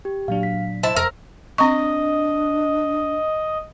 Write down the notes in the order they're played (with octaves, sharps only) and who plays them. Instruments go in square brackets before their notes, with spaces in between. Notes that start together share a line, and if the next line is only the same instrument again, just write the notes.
[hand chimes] G4
[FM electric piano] A#2 F#3 D4 [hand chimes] F5
[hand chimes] B6
[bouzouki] E4 A5 [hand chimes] C5
[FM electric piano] F2 [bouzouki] A#4 [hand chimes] E6
[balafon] C4 C#6 [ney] D4 [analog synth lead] D#5